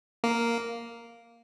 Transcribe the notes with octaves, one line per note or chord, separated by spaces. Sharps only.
A#3